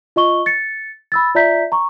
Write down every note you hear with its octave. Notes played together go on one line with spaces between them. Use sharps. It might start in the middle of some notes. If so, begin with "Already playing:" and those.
F4 D#5 C#6 G7
A6 C#7
B5 E6 A6
F4 D5 E5 A#5 G6 B6
A#5 C#6